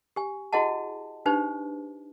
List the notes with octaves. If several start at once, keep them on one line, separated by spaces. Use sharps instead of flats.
G4 G#5
E4 F#4 G#4 D#5 F#5 A5
D4 D#4 G4 B4 C5